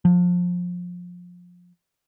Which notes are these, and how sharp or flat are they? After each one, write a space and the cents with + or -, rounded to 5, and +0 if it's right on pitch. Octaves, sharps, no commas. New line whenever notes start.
F3 +25